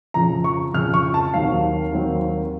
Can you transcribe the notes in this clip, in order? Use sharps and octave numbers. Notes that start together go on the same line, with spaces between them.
F2 C#3 F3 A#5
C#6
F2 C#3 F3 F6
C#6
A5
D#2 D#3 F#3 C4 F5
D#2 D#3 F#3 C4